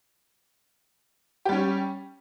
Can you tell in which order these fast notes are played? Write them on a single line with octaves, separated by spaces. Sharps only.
G4 G3 C#4